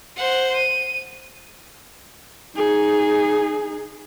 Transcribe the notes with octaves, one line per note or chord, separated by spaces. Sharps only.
C5 F#5
D#7
D#4 G#4